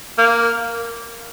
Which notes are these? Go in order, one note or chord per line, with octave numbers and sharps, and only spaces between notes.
A#3